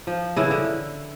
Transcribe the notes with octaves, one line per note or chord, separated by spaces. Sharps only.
F3
C#3 E3 E4
D3